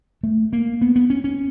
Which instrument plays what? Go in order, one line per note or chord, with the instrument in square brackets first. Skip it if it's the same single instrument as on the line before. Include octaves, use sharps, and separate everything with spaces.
[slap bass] A3
A#3
B3
B3
C#4
C#4